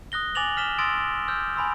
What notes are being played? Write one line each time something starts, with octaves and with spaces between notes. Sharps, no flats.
D#6 F#6 A#6 G7
G#5 D6 A6 A#6 F7 F#7
F6 B6 E7 G7
C6 D#6 E6 A6 A#6 D7
E6 F6 G6
G#5 B5 C6 E6